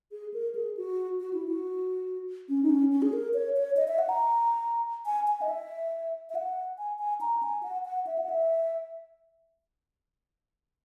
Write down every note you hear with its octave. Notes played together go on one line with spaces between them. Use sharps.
G#4
A#4
G#4
F#4
F#4
E4
F#4
C#4
D#4
C#4
C#4
G#4
A#4
C#5
C#5
D#5
E5
F#5
A#5
G#5
G#5
D#5
E5
E5
F#5
G#5
G#5
A#5
G#5
F#5
F#5
E5
F#5
E5